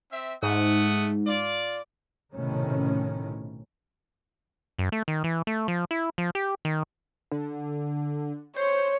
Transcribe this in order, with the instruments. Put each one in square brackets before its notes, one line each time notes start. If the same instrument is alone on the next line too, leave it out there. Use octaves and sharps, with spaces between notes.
[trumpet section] C4 E5
[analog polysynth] G#2 [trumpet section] A3 F#5 D#6
[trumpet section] F4 D5
[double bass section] B1 A2 C3 D#3 C#4
[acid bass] F#2
A3
D#3
E3
A3
F3
E4
F3
G4
D#3
[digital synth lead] D3
[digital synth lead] C5 [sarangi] C#5